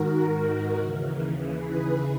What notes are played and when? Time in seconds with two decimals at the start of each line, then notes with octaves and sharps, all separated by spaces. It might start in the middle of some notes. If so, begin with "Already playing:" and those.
Already playing: G#2 D#3 F#4 A#4
0.71 D#2 C#3 E3
1.36 G#4 B4